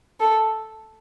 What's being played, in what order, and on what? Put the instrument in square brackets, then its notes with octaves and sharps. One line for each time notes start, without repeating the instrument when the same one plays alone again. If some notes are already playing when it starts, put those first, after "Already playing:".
[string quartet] A4